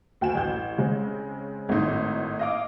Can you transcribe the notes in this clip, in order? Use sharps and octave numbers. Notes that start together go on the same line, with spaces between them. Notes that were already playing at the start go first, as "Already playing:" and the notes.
D2 G5 G#5 E7
A1 G6
C#3 G#3 C4
G#1 A2 A3 D#4 C6
D#5 F5 D6